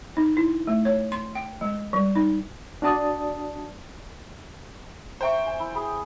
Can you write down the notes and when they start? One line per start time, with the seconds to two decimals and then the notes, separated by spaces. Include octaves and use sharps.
0.17 D#4
0.37 E4
0.67 A3
0.85 C#5
1.12 C6
1.35 G5
1.61 G#3
1.93 G3
2.16 D#4
2.82 D4 F#4 D5 A5 D#6
5.21 C5 E5 G5 A#5 C#6
5.46 G#5
5.59 E4
5.75 G#4 B5